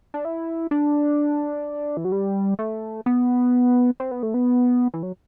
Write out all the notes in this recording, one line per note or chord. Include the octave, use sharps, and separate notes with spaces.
D4
E4
D4
E3
F#3
G3
A3
B3
C4
B3
A3
B3
E3
F#3